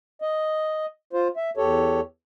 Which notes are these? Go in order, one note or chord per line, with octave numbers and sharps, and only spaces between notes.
D#5
F4 C5
E5
E2 G4 A4 C#5